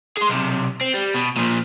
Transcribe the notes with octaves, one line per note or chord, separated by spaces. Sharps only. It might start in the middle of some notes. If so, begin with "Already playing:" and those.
G#4 C6
B1 C3
C4
G3
B2
A#2 F3